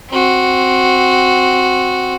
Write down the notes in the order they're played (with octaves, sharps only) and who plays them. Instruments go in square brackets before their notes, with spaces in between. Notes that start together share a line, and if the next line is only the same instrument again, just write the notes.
[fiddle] C4 F#4